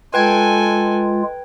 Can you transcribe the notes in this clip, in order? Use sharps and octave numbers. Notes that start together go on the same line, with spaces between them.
G#3 F4 A4 B4 G5 G#5 G#6